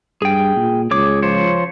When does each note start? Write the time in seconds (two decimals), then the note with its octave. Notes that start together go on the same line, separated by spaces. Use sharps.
0.22 G2 G#4 G5
0.56 A#2
0.91 C#2 G#4 C#5 D6
1.22 F3 C5 C#5